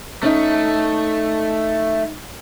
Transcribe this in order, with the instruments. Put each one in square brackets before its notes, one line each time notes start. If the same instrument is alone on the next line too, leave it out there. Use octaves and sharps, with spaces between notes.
[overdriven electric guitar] A3 [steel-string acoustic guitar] C#4 D#4